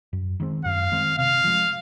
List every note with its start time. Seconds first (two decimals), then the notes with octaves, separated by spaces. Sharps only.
0.13 F#2
0.40 D#3 G#3 C4
0.65 F#2 F5
0.92 D#3 G#3 C4
1.18 C3 F5
1.44 F3 G#3